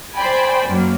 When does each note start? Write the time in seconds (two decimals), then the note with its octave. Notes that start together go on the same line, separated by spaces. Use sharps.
0.15 C5 D5 G5 G#5 B5
0.67 F#2 F#3 A#3